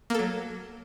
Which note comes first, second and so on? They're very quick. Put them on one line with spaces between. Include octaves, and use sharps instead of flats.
A#3 A4 F#3